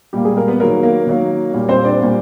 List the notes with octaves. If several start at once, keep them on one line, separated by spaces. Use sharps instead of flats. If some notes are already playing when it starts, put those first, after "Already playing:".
A#2 G3 A#3 G4
G#3 G#4
A#3 A#4
B3 B4
D#3 F#3 A#3 A#4
A#3 A#4
D#3 F#3 A#3
A#2 G3 A#3
C4 C5
D4 D5
A#2 G3 A#3